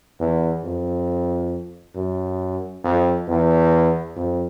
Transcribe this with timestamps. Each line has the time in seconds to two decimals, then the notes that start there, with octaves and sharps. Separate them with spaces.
0.20 E2
0.64 F2
1.95 F#2
2.84 F2
3.28 E2
4.16 F2